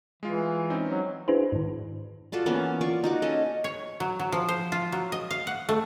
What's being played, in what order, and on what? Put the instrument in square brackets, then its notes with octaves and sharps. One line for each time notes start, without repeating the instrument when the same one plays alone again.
[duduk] E3 [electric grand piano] G#3 F4
[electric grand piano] C4 C#4 D#4
[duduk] F#3
[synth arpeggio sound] D4 E4 F#4 G#4 B4 C5
G#2 D#3
[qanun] F4 F#4 A4 D5
E3 A#3 B3 C#4
F4 D5 C#6
D#4 F#4 D6
C#4 A4 D#5
[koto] C#5
F#3
F#3
F3
C5
F4
F#3
D#5
F5
F#5
A3